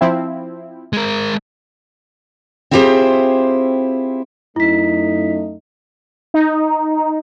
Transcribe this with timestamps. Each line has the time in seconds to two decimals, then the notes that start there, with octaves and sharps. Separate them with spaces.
0.01 F3 C4 E4
0.93 G#3 A#4
2.71 C4 E4 F4 G4 G#4 C5
4.56 F#2 A3 D#4 E4 B6
6.34 D#4